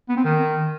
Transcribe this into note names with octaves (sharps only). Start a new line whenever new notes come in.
B3
C4
D#3